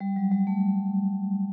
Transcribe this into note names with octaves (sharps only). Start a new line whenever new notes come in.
G3
F#3
G3
A3